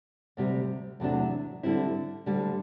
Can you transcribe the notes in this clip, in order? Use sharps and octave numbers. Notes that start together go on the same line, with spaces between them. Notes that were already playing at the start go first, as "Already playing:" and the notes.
D2 C3 G3
E2 C3 F#3 A3 D4
D3 G3 C4 E4
D2 D3 G3